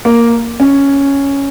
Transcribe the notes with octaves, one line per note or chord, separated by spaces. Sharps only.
A#3
C#4